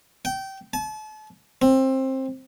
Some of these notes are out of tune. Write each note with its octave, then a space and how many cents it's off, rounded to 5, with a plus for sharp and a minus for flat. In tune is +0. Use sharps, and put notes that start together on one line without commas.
G5 -20
A5 -40
C4 +20